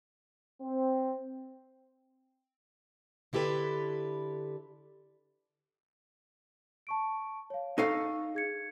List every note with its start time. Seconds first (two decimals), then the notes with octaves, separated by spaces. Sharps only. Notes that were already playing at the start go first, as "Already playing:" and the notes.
0.61 C4
3.33 D3 E4 G4 A4 B4
6.87 A5 C#6 D7
7.50 C#5 F5
7.78 D#4 A4 F5 C#6
8.35 G#4 G#6 C#7